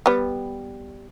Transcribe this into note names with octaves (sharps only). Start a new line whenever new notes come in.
G3 B3